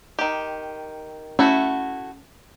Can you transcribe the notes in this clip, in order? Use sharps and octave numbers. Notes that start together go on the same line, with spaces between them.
D#3 G4
A3 C#4 E4 F#4